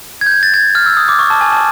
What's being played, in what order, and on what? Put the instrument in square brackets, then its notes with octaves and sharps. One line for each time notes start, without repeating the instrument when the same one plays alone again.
[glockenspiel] G#6
G6
G#6
A6
G#6
F6
E6
D#6
D6
C#6
A5
G#5
A5